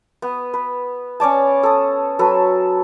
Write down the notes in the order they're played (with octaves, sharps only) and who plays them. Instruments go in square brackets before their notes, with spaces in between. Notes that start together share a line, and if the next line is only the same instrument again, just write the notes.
[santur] B3
B4
C#4 C#5 D5 A5
A4 D#6
F#3 A4 B4